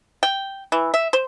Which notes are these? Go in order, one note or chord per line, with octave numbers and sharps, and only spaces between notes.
G5
E3
E5
C5